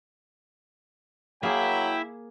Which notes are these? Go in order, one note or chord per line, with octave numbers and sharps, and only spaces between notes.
F#3 A#3 E4 G#4 E5 G5